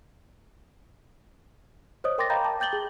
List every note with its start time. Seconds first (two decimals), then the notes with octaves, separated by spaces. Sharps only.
2.04 C5 C#5 D#5 D#6
2.18 A#4 G5 C6 D6 A6 A#6
2.30 D#5 F5 G5 A#5 B5 G6
2.45 A5 D6
2.60 G5 G6 A6 F#7 G7
2.73 G#4